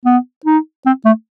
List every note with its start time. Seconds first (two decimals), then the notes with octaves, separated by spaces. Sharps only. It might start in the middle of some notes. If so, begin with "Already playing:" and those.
0.05 B3
0.46 D#4
0.86 C4
1.05 A3